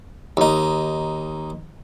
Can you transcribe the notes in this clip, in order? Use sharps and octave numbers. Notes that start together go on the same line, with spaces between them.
D#2 D#4